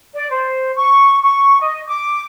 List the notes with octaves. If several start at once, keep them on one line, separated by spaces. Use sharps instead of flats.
D5
C5
C#6
C#6
D#5
D6